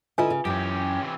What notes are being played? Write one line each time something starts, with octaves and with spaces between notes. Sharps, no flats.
D3 E4 F4 B4 D#5 G#5
C#3
F#2 E3 C#4 G4
C3 E3